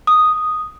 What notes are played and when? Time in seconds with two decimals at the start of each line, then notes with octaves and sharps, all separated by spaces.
0.07 D#6